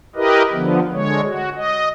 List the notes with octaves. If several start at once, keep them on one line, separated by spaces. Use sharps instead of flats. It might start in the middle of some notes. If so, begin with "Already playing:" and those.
E4 G4 A#4 B4 D#5
D3 F3 B3
D3 G#3 C#5
F#4
D#5